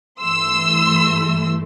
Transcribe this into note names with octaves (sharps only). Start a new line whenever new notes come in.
G2 E3 A3 C6 E6